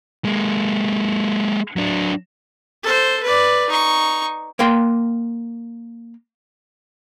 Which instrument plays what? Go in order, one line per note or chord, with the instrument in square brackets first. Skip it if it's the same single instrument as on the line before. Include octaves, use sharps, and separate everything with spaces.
[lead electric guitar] G#3 A#3
F#3 D4
[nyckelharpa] A4 C5
B4 D5
D#4 C#6
[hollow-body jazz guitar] A#3 A#4 G5 C6